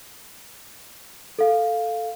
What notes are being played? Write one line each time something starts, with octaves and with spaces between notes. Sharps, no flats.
A4 F5